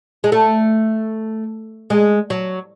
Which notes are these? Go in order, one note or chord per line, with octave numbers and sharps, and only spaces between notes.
G#3
A3
G#3
F#3